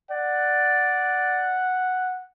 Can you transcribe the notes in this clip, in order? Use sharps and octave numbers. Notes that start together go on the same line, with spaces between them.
D5 F#5